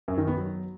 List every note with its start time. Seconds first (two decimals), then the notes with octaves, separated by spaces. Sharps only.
0.08 F#2
0.18 D#3
0.27 B3
0.37 F#3